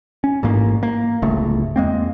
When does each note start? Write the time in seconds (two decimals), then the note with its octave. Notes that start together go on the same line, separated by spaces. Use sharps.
0.24 C#4
0.43 A1 G#2 A#3
0.83 A#3
1.22 D1 G1 C#2 A3
1.76 E2 G#3 A#3 C4